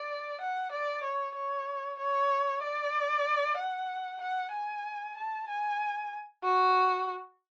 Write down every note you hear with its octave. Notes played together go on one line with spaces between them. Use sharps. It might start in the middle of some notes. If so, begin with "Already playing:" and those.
Already playing: D5
F#5
D5
C#5
C#5
C#5
D5
F#5
F#5
G#5
A5
G#5
F#4